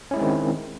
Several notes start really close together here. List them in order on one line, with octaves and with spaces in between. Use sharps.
C#4 E4 G#3 C4 D#3